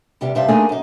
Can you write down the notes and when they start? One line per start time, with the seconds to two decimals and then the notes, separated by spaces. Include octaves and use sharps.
0.21 E2 C3 G3 B3 G4
0.35 G2 C3 F3 D#4 E5 A5
0.48 A3 A#3 C4 D4 D#4 G#4
0.69 F#2 D#4